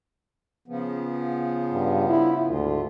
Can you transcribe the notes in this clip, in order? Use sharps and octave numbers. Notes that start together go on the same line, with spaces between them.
C#3 F3 B3
G2
E4
D2 G#2 F4